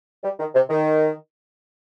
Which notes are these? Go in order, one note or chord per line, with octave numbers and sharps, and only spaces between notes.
G3
D#3
C3
D#3